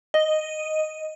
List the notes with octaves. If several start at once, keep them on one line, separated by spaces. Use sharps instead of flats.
D#5